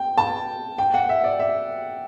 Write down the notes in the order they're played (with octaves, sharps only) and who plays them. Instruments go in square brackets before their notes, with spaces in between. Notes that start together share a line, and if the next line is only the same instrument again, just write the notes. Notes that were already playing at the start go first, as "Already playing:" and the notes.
Already playing: [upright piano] G5
A5
G5
F#5
E5
D5
E5